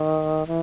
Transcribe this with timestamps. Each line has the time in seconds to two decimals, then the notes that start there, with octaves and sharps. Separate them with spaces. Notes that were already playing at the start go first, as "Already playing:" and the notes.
Already playing: D#3
0.47 E3